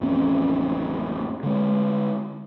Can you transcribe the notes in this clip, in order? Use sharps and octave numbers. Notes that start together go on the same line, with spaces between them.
A1 F2 C4 C#4
D3 G#3